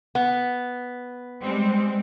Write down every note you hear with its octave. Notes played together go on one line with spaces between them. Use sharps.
B3
G3 G#3 C4